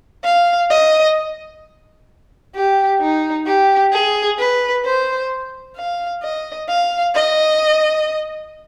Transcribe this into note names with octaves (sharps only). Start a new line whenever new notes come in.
F5
D#5
G4
D#4
G4
G#4
B4
C5
F5
D#5
F5
D#5